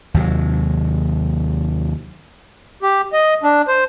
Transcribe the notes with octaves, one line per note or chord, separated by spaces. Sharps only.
D#2 C3 F#3
G4
D#5
D4
C5